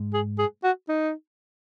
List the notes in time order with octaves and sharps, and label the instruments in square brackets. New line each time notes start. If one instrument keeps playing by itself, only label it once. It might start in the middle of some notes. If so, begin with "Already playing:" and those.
Already playing: [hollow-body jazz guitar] G#2 G#3
[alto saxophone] G#4
G#4
F#4
D#4